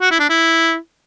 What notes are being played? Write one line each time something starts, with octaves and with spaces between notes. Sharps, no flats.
F#4
E4
D4
E4